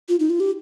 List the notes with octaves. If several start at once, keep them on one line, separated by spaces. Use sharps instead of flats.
F4
D#4
F4
G4